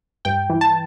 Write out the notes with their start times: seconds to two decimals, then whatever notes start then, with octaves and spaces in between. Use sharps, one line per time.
0.25 G2 G5
0.50 E3
0.61 A5